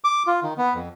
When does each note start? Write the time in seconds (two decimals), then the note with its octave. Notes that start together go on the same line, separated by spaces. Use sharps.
0.04 D6
0.27 F4
0.43 D#3
0.58 B3
0.75 F2